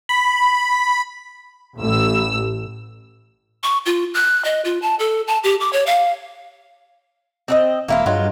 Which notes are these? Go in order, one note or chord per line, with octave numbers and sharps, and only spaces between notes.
B5
A1 E6
C#6
F4
F#6
D#5
F4
A5
A4
A5
G4
D6
C#5
F5
C4 D4 D#5
E1 A#3 E4 F4
G2 F#3 G#3 F4